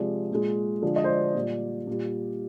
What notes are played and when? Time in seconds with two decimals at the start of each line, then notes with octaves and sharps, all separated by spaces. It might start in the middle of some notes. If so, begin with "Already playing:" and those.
Already playing: C3 F3 G#3 D5
0.31 A#2 G#3
0.82 D3 F3 G#3 D5
0.96 D#5
1.04 C5
1.09 D5
1.23 D5
1.35 A#2 G3
1.87 A#2 G3